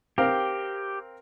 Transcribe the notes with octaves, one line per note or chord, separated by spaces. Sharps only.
C4 G4 A#4 F5